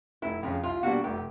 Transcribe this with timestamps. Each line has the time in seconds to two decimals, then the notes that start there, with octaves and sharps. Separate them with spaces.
0.22 F1 E4
0.43 F2 C#3 F4
0.63 C2 F4
0.83 B2 G3 A#3 D4 F#4
1.04 F1 G4